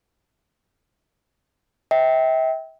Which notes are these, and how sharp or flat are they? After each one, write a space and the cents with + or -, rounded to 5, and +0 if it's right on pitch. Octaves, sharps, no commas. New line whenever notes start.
E5 -35 G5 -5